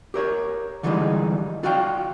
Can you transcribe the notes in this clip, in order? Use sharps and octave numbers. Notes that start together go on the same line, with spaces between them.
G4 A#4 C#5
D3 E3 F3 G3 G#3 D#4
F4 F#4 D5 F5 G5